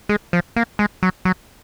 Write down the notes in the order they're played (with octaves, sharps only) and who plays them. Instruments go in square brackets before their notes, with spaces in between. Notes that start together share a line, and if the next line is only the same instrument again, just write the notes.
[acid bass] G#3
F3
A#3
G#3
F#3
F#3